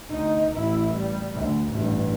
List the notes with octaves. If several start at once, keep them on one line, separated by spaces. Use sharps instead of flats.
D2 D#4
A1 E4
G3
D2
A1 G2